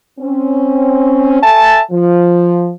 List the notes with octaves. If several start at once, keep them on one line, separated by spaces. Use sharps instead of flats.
C4 C#4
A4 E5 G#5 A5
F3